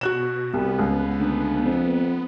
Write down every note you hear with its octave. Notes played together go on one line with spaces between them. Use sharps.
B2 F#4 F#6 E7
C2 B3
C#2
D2
F2